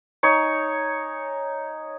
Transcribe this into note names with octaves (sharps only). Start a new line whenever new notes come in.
D#4 C#5 G#5 C#6